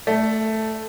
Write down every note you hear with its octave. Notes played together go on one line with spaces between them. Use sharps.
A3